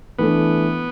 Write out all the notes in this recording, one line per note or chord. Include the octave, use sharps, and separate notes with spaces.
E3 A3 B3 D4 A4